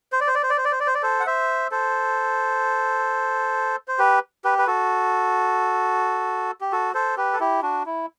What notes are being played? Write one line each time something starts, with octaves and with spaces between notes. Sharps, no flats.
C5
D5
C5
D5
C5
D5
C5
D5
C5
D5
C5
D5
A4 C5
F#5
C5 E5
A4 C5
C5
G4 B4
G4 B4
B4
F#4 A4
G4
F#4 A4
A4 C5
G4 B4
A4
E4 G4
D4 F#4
E4